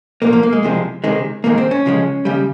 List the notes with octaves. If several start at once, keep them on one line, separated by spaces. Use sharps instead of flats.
C2 A#2 F3 A#3
A#3
A#3
G#3
C2 C3 F3 G#3
C#2 C3 D#3 G#3
G#2 D#3 G#3 A#3
C4
C#4
C#2 C#3 F3 G#3
D#2 C#3 G3